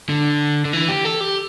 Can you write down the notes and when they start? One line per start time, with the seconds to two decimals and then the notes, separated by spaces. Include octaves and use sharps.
0.09 D3
0.65 D3
0.73 E3
0.89 G4
1.05 A4
1.21 G4